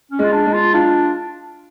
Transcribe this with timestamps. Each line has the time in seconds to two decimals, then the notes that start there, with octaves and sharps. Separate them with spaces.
0.12 C#4
0.19 G#3 F4
0.32 D4
0.46 G#3
0.53 F4
0.74 D4 F4